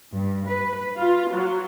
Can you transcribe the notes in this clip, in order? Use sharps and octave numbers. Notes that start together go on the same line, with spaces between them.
G2
B4
F4
F#3